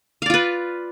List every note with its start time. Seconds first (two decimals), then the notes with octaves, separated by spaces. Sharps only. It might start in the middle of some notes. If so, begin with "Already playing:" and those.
0.22 F5
0.26 D5
0.30 F4
0.34 B4